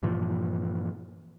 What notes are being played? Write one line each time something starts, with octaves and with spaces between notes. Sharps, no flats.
G2 A#2 E3 F3